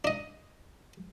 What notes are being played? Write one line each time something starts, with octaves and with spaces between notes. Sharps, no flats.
D4 D#5